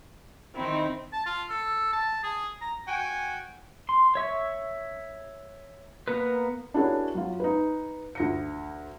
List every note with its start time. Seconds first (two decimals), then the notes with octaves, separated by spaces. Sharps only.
0.56 D#3 C4 D#4 E4
1.13 A5
1.26 F4
1.49 A4
1.93 A5
2.23 G#4
2.61 A#5
2.88 F#4 G5 G#5
3.89 C6
4.15 C#5 E5 C#6
6.08 A#3 B3 A#4 B4
6.74 D4 E4 F#4 G#4 A#4 C#5
7.15 F#3 F4
7.40 D#4 B4
8.15 D2 A#6 C#7